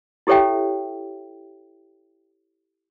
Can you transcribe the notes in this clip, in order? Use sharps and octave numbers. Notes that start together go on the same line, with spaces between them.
E4 G4 A4 C#5 E5 G5